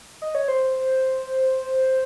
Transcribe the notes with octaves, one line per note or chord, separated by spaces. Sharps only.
D#5
C#5
C5